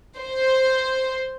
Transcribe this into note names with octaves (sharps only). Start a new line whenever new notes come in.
C5